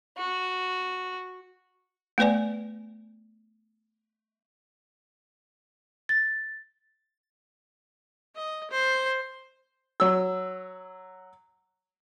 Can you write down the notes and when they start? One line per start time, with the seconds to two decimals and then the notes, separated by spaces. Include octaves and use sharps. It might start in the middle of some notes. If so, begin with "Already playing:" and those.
0.18 F#4
2.18 A3 B3 B4 D5 G#5
6.09 A6
8.36 D#5
8.71 C5
10.00 F#3 E6